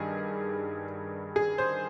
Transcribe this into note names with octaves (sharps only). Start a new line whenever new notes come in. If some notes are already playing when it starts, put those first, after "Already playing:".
Already playing: G2 D#3 G3 G#4
G#4
C5